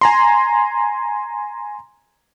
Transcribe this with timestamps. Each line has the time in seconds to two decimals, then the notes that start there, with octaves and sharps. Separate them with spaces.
0.01 G#5 A#5 C6